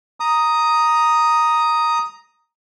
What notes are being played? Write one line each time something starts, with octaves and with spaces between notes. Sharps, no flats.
A#5 D#6